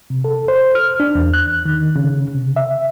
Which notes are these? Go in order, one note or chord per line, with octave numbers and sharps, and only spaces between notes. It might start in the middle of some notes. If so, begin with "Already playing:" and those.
C3
A4
C5
F6
D4
E2
F#6
D#3
C#3
C3
E5